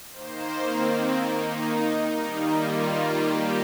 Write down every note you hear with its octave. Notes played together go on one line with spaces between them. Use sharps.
D#3 A#3 C5
C4
D#4
D#3 G3 A#3
F4
G4